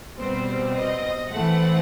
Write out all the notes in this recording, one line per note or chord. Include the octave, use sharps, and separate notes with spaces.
B2 G3 C4 C5
D#5
A2 E3 A3 C4 F#5